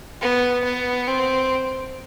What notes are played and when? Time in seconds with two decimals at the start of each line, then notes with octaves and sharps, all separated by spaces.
0.21 B3
0.64 B3
1.07 C4